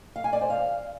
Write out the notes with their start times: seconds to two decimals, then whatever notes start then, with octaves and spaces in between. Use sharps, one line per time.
0.16 F5
0.24 G#5
0.33 D5
0.41 C5
0.50 F5